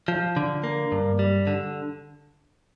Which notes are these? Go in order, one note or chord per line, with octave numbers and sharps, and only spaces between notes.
F3
D3
A#3
G2
G3
D3